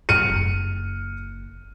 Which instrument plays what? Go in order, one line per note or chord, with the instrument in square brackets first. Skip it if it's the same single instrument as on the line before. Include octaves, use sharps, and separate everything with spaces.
[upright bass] G2 C3 [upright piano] F6 C#7 D#7
[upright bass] F#1